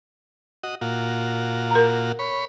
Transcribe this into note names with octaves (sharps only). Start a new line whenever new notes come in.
F#4 D#5
A#2 F4 F#4
A#4 A#5
C#5 B5